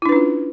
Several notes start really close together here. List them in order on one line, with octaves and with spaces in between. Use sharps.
E4 D4 B4 C#4 F4